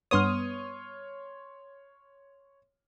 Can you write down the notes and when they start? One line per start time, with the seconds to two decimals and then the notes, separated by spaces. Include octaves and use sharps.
0.11 G2 B3 C#5 C6 D#6 F6